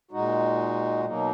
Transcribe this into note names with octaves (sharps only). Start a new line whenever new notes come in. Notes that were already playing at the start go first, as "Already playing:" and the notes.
A#2 G#3 D#4 F#4
B2 F#3 A#3 D#4